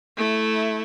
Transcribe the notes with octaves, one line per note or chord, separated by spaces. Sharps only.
A3 E4